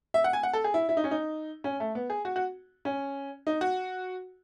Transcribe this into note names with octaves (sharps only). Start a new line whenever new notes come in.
E5
F#5
G#5
F#5
A4
G#4
E4
E4
D#4
C#4
D#4
C#4
A3
B3
G#4
F#4
F#4
C#4
D#4
F#4